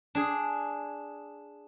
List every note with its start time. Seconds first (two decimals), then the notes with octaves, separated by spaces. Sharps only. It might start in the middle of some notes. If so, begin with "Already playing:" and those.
0.15 D4 G#4